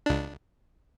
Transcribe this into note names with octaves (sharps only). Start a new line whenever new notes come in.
C#2 D4